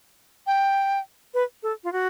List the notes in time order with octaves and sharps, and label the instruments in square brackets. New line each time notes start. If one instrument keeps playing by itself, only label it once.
[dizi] G5
[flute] B4
A4
F4
F#4